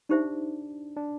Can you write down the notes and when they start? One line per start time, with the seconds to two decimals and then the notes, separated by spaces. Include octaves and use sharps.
0.09 D4 D#4 G4 C5 E5
0.97 D4